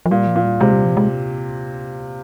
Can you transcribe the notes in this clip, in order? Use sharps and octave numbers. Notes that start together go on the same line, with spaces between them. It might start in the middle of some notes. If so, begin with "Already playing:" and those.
F3
A#2 G3
F3
A#2
G3
C3 G#3
G3
F3
G#3